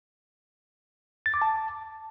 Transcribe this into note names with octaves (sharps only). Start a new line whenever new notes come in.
A6
D6
A5